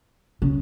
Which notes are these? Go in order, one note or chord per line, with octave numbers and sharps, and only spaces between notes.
C#3